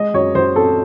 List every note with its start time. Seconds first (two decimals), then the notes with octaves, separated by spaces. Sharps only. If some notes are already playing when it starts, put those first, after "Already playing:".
Already playing: G#3 D#5
0.14 F#2 C#5
0.35 F#2 C5
0.56 C4 A4